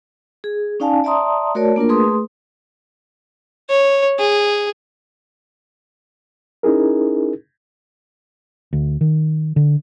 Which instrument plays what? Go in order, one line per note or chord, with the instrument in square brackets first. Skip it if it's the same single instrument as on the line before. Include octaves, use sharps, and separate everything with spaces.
[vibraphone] G#4
C#4 D#4 D5 F5 G#5 A5
D5 E5 A5 A#5 C6 D#6
A3 F#4 A#4 C#5 D5 A5
A#3 D4 F4 A#4
A3 G#4 B4 C6 D#6
[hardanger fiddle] C#5
G#4
[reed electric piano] C#4 D#4 E4 G#4 A#4
[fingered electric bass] D2
D#3
D3